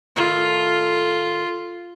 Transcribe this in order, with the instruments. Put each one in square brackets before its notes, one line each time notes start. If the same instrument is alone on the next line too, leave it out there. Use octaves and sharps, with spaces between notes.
[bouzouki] A2 D#3 A4 [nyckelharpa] F4